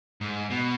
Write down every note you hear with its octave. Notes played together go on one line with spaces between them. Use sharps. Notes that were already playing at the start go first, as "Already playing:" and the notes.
G#2
B2